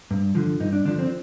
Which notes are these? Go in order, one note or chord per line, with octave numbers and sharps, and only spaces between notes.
G2
D3 F3
G2 D#4
D4
D3 F3 D4
C4